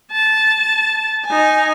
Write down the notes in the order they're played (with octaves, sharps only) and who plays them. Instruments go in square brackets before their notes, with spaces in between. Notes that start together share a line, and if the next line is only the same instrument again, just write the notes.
[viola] A5
D#4 G#5